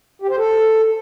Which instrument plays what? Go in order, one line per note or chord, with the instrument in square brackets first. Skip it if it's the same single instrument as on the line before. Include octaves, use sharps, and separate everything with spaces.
[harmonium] G4
C5
A4